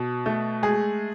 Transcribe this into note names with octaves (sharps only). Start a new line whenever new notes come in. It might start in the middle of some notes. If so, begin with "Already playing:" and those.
Already playing: B2
A3
G#3 G#4